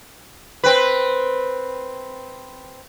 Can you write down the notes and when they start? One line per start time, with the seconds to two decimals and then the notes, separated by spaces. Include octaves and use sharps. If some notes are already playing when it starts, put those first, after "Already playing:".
0.64 C4 B4